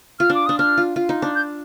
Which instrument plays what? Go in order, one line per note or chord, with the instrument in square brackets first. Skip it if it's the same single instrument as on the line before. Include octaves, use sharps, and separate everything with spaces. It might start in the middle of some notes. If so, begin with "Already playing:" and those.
[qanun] F4 [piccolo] F6
[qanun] D4
[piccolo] D6
[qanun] D4 [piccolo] D#6
[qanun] D4 [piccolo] F6
[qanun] F4
F4
D#4
D4
[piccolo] G6